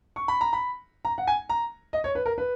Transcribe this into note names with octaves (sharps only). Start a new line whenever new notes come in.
C#6
B5
A#5
B5
A#5
F#5
G#5
A#5
D#5
C#5
B4
A#4
B4